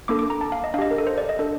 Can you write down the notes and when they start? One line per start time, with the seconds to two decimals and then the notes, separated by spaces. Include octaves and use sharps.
0.08 A#3 D4 A4 D6
0.19 D6
0.30 A#5
0.41 A5
0.52 F5
0.64 D#5
0.74 D4 F5
0.78 G4 D#5
0.91 A#4
0.98 A4
1.07 C5
1.18 D5
1.29 D#5
1.39 D4 A4